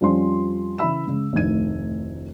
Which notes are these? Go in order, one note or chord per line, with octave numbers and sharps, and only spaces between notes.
F2 F3 G3 C#4 C6
C#3 E3 E5 B5 E6 E7
C#3 G#3
F1 D2 A2 D#3 G#6 D#7